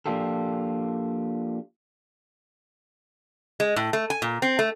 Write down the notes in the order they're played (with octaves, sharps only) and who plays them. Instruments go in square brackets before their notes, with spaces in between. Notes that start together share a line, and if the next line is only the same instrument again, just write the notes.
[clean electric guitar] F3 A#3 D4 F4 G4 A4
[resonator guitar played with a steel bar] G#3
A2
A3
G#5
A#2
C4
A3